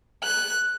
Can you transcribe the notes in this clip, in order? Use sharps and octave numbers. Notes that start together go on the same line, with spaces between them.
F#6